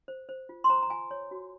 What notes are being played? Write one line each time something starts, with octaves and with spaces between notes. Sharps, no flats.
C5
C5
F4
C6
C5 A#5
A#5
F4 G#5
C#5
F#4